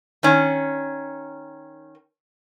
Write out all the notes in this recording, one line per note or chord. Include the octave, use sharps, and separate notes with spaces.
D#3 C#4